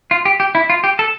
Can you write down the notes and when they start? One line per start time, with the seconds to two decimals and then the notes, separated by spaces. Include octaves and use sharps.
0.11 F4
0.25 G4
0.40 G4
0.55 E4
0.70 F4
0.84 G4
0.99 A4